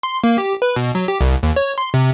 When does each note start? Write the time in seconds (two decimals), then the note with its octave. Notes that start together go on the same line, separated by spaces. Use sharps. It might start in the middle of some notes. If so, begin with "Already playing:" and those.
0.03 C6
0.24 A#3
0.38 G4
0.62 B4
0.76 B2
0.95 F#3
1.08 G4
1.21 C2
1.43 D#2
1.56 C#5
1.78 C6
1.94 C3